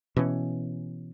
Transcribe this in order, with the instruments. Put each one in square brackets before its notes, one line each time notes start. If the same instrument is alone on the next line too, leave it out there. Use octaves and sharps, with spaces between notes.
[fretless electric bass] B2 E3 C#4